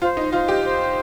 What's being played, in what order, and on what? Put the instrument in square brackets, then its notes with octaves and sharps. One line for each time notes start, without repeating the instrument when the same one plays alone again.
[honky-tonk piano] F4 [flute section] C5
[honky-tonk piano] D#4
[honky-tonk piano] F4 [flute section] C5
[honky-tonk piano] G4
[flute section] C5